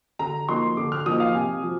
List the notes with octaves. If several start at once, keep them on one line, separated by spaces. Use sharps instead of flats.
D3 A#5
F3 A#3 D#4 C6
D3 D6
F6
F3 A#3 D#4 D#6
F5
C3 G#5
F3